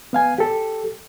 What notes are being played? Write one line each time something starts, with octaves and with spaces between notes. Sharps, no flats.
B3 F5 G#5
G4 A4